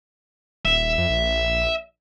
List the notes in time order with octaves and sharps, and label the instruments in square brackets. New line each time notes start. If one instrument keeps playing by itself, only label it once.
[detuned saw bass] D#1 [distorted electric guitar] E5
[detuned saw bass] F2
A#1